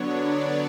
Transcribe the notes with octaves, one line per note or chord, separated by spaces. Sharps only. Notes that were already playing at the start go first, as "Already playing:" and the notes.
Already playing: D3 F#3 B3 D4 C#5
D5